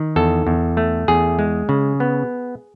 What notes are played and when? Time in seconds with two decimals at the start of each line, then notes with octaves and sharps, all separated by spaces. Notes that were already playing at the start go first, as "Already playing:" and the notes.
Already playing: D#3
0.16 E2 A4
0.47 E2
0.77 A3
1.08 E2 G#4
1.39 G#3
1.69 C#3
2.00 B3